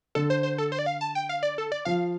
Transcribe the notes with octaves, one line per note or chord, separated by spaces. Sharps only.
D3 A4
C5
C5
A4
C5
D5
F5
A5
G5
F5
D5
A4
D5
F3 F5